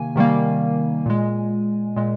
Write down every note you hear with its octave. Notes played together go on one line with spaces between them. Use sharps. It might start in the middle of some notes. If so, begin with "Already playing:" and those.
Already playing: C3 D#3 A#3 G#5
C3 D#3 G3 A#3
A#2 G#3
A#2 G#3